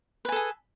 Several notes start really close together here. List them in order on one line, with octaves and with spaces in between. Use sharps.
B4 G#5 A4 G#4